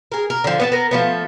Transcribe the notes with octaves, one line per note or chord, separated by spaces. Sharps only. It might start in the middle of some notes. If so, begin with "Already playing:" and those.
G#4 A#4
A#4
D3 F3
B3 D4 A5
B3 A#4
F3 A3 B3